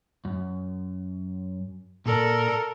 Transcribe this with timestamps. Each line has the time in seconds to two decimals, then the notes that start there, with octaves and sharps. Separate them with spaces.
0.25 F#2
2.06 A#2 A4 A#4 D5